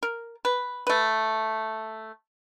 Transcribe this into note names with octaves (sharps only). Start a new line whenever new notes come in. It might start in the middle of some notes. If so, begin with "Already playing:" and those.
A#4
B4
A3 B4